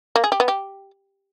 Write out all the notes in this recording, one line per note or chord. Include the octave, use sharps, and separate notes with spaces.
A#3
G#4
G4
B3
G4